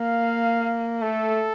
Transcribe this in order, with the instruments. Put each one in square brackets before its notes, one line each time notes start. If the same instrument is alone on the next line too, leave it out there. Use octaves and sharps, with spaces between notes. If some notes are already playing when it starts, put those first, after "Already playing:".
Already playing: [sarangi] A#3 [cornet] F5
[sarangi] A3 [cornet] A4